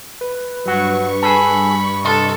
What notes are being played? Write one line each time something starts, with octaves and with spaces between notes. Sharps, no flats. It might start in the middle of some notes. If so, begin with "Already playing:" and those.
B4
G2 F#3 F#4 C#6
G#4 A4 B5
C2 A4 D#5 C6